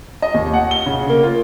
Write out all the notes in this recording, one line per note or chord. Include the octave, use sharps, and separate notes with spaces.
D#5
D#2
F#5
G7
C#3
A#3
F4